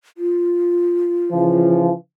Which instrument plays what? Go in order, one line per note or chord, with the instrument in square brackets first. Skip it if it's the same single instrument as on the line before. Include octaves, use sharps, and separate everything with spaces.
[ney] F4
[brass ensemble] C#3 E3 F3